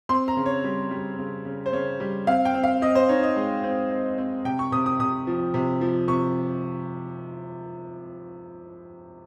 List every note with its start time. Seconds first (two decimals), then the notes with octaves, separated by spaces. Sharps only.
0.09 C4 C6
0.28 A#5
0.37 C#3
0.46 C#5
0.64 G3
0.91 G3
1.19 C#3
1.45 C#3
1.66 C5
1.73 C#3 C#5
2.00 G3
2.27 C4 F5
2.45 G5
2.54 C4
2.64 F5
2.82 C4 D#5
2.95 C5
3.09 D#4 C#5
3.23 D#5
3.36 G#3
3.64 C4
3.91 C4
4.18 C4
4.45 C3 G5
4.59 C#6
4.72 C3 D#6
4.86 D#6
4.99 C3 D#6
5.27 F3
5.54 C3
5.81 F3
6.08 C3 C#6